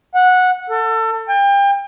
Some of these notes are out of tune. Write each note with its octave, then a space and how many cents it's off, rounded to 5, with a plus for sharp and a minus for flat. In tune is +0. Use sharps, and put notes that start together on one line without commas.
F#5 -15
A4 +30
G5 +35